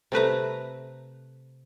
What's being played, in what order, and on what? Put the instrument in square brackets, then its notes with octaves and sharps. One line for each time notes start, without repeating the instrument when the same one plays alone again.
[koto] C3 A3 B4 A#5